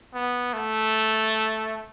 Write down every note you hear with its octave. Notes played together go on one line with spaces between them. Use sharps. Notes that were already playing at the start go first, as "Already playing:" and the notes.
B3
A3